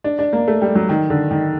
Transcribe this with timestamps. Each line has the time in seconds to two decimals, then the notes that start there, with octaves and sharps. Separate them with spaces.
0.04 D4
0.19 D4
0.33 A#3
0.48 A3
0.62 G3
0.75 F#3
0.89 D#3
1.10 D3
1.31 D#3